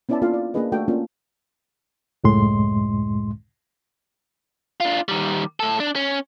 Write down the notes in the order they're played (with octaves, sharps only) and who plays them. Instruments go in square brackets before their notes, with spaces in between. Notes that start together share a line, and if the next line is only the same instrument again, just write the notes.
[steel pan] B3 C#4 E4 D5 E5 A5
A#3 D4 F4 A4 F5
D5
A#3 C#4 D4 G#4 B4 D#5
A3 D4 F#4 A4 F5 G5
A#3 C#4 D4 F4
[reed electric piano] C#2 F#2 A2 G#3 C6
[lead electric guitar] D4 F4
D#3 G3
A2 A4
D4
C#4